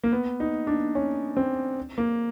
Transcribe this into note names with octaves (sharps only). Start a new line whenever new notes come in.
A#3
B3
D#4
D4
C#4
C4
A#3